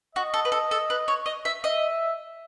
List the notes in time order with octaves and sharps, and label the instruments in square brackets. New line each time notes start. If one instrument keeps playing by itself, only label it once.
[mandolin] F#4 [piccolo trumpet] D#5
[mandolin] A4
B4
A4
A4
B4
C#5
D#5
E5
[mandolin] D#5 [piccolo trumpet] E5